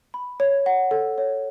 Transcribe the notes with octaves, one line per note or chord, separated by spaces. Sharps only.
B5
C#5
F#5
A4
C#5